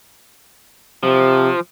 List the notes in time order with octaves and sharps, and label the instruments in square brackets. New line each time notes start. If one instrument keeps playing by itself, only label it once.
[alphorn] C3 [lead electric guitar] F3